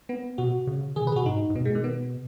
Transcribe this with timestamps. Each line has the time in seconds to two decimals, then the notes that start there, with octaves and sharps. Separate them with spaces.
0.09 B3
0.38 B2 F#4
0.67 C#3
0.96 D#3 G#4
1.02 B2
1.06 C#3 B4
1.12 G#4
1.16 B2 F#4
1.26 G#2 D#4
1.50 G#2
1.55 B2 B3
1.65 G#3
1.75 D#3
1.84 B3